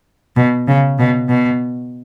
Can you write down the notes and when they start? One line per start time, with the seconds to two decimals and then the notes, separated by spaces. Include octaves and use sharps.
0.36 B2
0.68 C#3
0.99 B2
1.29 B2